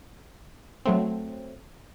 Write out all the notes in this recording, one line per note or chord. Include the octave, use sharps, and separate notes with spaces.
F#3 A3 C4